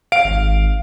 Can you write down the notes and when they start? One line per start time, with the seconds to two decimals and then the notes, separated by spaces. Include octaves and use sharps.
0.12 F5 D7
0.24 G#1